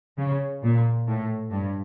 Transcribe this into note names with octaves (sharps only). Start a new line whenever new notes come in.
C#3
A#2
A2
G2